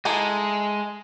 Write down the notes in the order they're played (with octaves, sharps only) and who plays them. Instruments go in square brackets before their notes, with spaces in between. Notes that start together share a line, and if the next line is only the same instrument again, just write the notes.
[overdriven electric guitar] G#3 [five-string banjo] D#4 E4 A4